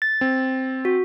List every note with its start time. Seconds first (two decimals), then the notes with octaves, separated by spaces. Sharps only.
0.02 A6
0.21 C4
0.85 F#4